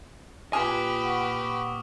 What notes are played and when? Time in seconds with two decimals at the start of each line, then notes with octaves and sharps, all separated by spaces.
0.53 A#2 F4 G4 B4 G#5 D6 D#6 F6
1.04 F#5 C#6